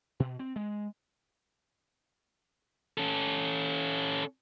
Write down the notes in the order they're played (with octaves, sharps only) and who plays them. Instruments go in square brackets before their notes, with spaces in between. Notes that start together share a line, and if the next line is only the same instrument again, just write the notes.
[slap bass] B2
C4
G#3
[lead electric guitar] C#4 A4